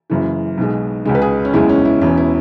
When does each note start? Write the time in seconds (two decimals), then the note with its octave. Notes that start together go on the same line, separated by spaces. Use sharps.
0.10 F#1 F#2 C#3 E3
0.58 B1 B2 G#3
1.05 C#2 C#3 G#3
1.15 B4
1.22 G#4
1.45 C#4
1.54 F#1 E2 C#3 E3 G#3 E4
1.69 C#4
1.85 E4
2.01 E1 E2 E3 C#4
2.17 E4